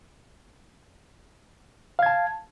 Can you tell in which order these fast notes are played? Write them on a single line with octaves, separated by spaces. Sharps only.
F5 G#6 A5